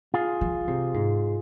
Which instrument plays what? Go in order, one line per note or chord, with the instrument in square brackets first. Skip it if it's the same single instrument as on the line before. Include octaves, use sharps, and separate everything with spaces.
[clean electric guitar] F4 G#4
[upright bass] F3
C3
G#2